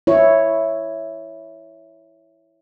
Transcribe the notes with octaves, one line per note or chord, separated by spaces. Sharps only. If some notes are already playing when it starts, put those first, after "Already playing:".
E4 C#5